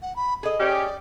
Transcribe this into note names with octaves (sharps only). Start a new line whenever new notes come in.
F#5
B5
G#4 A4 D#5
C#4 G4 D5